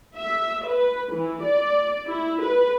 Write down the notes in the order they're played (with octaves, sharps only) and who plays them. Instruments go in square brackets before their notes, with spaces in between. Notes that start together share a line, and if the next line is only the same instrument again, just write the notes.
[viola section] E5
B4
E3
D5
E4
B4